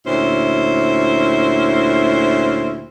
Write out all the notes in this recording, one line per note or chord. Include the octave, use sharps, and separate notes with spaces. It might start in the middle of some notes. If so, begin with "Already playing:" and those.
D2 A#2 C#4 E4 C5